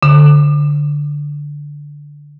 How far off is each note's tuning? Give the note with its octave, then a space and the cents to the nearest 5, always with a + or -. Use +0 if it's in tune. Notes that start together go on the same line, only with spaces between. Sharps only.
D3 -5